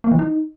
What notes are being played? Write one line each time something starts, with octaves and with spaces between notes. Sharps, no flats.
A#3
E3
D#4